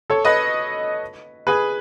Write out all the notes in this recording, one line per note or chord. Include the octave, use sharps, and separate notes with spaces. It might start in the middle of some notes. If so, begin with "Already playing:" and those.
A4 C#5
B4 D#5
G#4 B4